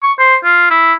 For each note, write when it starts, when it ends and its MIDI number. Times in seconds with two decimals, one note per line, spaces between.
0.03 0.13 85
0.19 0.36 72
0.44 0.68 65
0.70 0.93 64